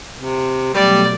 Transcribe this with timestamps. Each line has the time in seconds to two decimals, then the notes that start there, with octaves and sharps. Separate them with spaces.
0.20 C3
0.74 B2 F#3 G3 A3 D5